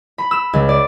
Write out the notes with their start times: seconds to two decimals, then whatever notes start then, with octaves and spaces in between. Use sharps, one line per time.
0.18 B5
0.31 E6
0.53 C#2
0.69 D5